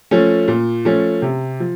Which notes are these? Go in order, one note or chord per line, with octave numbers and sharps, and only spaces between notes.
F3 A3 C#4
A#2
F3 A3 C#4
C3
F3